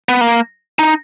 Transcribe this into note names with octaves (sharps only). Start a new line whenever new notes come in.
B3
A#3
D#4